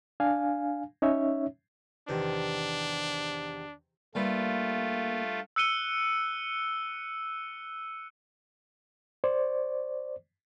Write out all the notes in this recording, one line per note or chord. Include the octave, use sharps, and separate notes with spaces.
D4 F5 G#5
C#4 D#4 C#5 E5
E2 C3 D#3 D4
G2 G3 A3 A#3 F4 B4
E6 F#6 C#7 D#7 G7
C5 D5